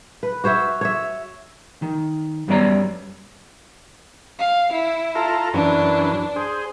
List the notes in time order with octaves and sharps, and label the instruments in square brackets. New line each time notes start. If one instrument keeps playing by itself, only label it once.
[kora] B4
F#4 C5 C#5 E5
C#5 E5
[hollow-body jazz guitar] D#3
F#2 G3 B3 C#5 D5 A#5
[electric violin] F5
E4
[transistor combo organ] F4 A4 A#5
[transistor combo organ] F#2 E3 [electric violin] D4
[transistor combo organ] G#4 C5